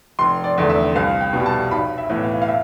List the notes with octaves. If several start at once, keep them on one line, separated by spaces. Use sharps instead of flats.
F1 C6
D5
E2 D3 A3
E5
C2 F5
G5
B2 G3
A5
B1 B5
E5
A2 E3 B3
F5
F5
E5